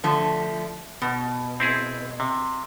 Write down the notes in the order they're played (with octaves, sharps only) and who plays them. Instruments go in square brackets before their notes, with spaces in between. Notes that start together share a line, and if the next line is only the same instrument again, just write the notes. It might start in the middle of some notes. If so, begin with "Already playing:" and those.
[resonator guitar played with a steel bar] D3 F3 A3
B2
[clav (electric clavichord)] C4 E4 G#4
C3